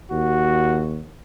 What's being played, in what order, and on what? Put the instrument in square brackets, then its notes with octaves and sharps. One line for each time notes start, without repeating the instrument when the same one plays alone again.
[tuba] D#2 [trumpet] F#4